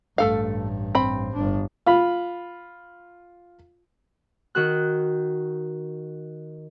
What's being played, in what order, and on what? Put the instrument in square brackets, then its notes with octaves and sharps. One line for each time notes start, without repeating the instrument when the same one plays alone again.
[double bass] A1 G2 [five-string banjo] A3 A4 F5
[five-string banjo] C4 B5
[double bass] G1 D4
[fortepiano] F4 B5
[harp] D#3 F#4 F#6